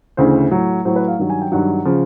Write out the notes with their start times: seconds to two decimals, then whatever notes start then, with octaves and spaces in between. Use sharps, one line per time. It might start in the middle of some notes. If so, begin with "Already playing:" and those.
0.17 D2 C#3 E3 C5
0.51 A2 F#3
0.85 A2 F#3 C5
0.96 B4
1.08 F5
1.19 G2 D#3 F#3
1.30 G#5
1.41 G5
1.52 G2 D#3 F#3 F#5
1.85 C#3 F3